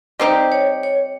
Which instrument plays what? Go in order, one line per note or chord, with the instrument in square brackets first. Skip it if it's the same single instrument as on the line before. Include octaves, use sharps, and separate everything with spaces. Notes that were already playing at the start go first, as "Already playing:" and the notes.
[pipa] G3 C4 D#4 G4 [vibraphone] C5
[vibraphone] C#5
C#5